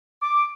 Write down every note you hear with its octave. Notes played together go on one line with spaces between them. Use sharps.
D6